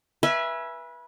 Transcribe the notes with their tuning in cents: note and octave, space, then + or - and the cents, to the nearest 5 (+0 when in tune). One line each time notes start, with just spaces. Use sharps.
B4 -25 E5 +15 G#5 +0